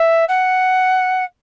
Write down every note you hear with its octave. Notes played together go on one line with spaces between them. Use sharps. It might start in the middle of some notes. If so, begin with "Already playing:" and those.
Already playing: E5
F#5